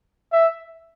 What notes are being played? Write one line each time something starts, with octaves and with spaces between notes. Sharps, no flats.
E5